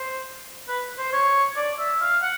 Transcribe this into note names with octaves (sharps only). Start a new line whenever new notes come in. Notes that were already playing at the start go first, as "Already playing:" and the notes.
Already playing: C5
B4
C5
C#5
D5
E5
F5
F#5